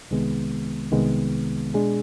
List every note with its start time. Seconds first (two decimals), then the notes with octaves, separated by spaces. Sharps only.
0.11 C2 C3 D#3 G#3 B3
0.92 C2 C3 D#3 G#3 B3
1.74 B2 G#3 D4 G#4